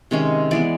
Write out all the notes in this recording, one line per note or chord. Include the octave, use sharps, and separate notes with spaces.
C3 D#3 G#3 C#4
E3 G#3 B3 D5